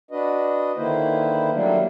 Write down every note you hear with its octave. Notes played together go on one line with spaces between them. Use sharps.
D4 F#4 B4 D#5
D3 D#3 A#3 E4 B4 C5
F#3 G3 A3 A#3 D4